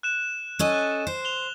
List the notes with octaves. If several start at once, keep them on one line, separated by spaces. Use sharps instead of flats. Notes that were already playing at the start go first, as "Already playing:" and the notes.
F#6 E7
C#4 A4 D#5
F#6
C5
F7 G7